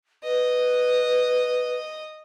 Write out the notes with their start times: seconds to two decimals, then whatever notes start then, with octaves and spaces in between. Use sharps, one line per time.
0.24 B4 D#5